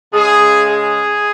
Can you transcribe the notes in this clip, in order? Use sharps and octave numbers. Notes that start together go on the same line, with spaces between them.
C#3 G#3 G#4
G#4